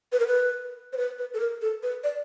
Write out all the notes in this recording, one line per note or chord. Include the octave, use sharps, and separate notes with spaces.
B4
A#4
B4
C5
B4
B4
A4
A#4
A4
B4
D5